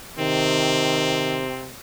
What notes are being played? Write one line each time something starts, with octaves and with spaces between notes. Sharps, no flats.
C3 D#3 C4